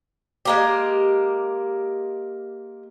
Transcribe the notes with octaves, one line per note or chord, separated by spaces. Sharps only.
G#3 A#3 G4